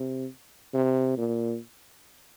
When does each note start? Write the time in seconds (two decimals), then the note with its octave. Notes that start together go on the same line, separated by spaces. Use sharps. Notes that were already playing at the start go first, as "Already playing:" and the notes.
Already playing: C3
0.74 C3
1.17 A#2